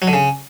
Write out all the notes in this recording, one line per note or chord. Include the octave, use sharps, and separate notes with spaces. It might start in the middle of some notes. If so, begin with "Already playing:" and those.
F#3
D3
C#3